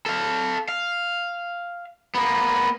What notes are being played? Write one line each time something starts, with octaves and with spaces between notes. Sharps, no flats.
A4 F5
F5
A#3 B3